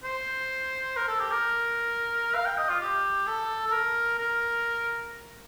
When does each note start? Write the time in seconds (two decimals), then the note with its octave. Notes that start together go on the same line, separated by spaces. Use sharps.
0.04 C5
0.96 A#4
1.08 A4
1.19 G4
1.31 A#4
2.35 F5
2.45 G5
2.57 D#5
2.69 F4
2.80 G4
3.27 A4
3.67 A4
3.72 A#4
4.18 A#4